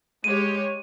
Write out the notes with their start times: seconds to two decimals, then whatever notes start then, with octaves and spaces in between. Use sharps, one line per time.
0.24 G#3 G4 C#5 D#7